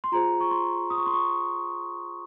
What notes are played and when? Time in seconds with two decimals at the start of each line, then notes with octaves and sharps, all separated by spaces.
0.04 C6
0.12 F4 G#4 C5 A#5
0.40 C#6
0.51 C6
0.90 D#6
0.98 C#6
1.06 C6
1.13 C#6